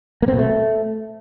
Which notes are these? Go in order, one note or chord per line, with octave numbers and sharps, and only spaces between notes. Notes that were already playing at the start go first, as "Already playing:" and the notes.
A#3
C4
B2
A3